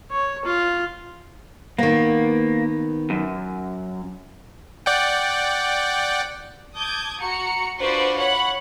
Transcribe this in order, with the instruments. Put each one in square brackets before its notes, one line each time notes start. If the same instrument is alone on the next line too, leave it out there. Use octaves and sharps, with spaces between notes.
[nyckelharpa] C#5
F4
[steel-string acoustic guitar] D#3 B3 [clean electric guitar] A#3
[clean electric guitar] F#2
[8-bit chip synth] D5 F#5 G5
[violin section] A5 D6 D#6 G6 G#6
F#4 A#5 C#7
D4 F4 F#4 B4 C5 D5
C#5 F#5 B5